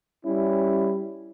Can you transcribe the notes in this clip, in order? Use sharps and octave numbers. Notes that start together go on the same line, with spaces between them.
G3 C#4 E4